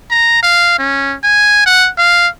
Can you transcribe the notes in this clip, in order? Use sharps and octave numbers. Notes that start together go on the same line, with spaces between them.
A#5
F5
C#4
G#5
F#5
F5